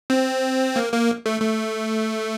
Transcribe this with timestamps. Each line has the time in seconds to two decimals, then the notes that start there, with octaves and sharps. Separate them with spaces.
0.10 C4
0.76 A#3
0.93 A#3
1.26 A3
1.41 A3